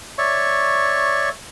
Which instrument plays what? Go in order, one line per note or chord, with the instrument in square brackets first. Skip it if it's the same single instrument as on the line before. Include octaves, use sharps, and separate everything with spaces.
[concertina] C#5 D5 E5 C#6